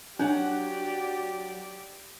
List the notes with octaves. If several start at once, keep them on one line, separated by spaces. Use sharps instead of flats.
F#3 D4 G4 D5 F#5